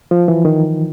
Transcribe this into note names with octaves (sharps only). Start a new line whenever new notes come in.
F3
E3
D#3